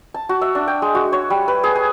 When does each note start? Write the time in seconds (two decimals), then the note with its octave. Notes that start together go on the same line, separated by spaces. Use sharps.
0.14 A5
0.29 F#4
0.42 E5
0.55 D4
0.67 G5
0.82 G#3
0.95 F#4
1.12 C#5
1.30 G3
1.48 B4
1.64 G#4
1.75 G#5